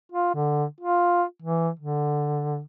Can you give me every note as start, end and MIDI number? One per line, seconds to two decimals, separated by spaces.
0.12 0.31 65
0.35 0.65 50
0.81 1.23 65
1.42 1.70 52
1.79 2.60 50